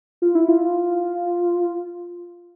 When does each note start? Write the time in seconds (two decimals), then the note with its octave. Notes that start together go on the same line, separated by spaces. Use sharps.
0.22 F4
0.35 E4
0.48 F4